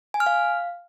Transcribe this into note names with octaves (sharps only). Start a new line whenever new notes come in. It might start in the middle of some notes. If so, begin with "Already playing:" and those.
G#5
F6
F5